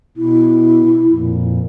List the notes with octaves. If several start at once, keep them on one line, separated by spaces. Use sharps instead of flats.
B2 E4
F2 A#2